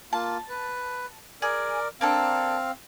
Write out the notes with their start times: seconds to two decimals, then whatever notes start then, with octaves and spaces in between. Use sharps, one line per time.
0.13 A#3 F4 A5
0.49 B4
1.42 G#4 A#4 D5
2.01 A#3 C4 D4 A4 F5